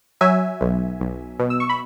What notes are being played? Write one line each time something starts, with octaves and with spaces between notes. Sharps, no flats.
F#3 E5 G#5
B1
B1
B2
E6
C#6
B5